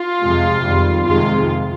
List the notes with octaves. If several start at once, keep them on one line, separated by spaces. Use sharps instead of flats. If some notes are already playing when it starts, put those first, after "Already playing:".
Already playing: F4
F2 C3 F3 G#3
F2 D#3 G3
F2 C3 D#3 G#3 F4